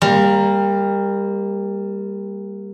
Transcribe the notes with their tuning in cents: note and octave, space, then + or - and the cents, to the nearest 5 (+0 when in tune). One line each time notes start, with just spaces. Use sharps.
G3 +25 A#3 +0